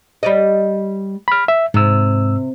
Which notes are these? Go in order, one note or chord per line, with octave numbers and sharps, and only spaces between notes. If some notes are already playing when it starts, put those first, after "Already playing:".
G3 D5 D#5
B5 F6
E5
G#2 C3 E6